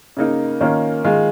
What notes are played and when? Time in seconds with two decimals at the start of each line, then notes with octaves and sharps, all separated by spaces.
0.17 C#3 A#3 D#4
0.61 D#3 A#3 C#4 F4
1.04 D#3 G#3 F4